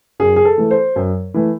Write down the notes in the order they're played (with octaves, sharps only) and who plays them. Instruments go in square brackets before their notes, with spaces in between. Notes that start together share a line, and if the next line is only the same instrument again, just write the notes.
[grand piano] F#2 G#4
G#4
A4
E3 A3
C5
F#2
E3 A3